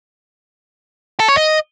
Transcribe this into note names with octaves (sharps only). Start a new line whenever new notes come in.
A4
C#5
D#5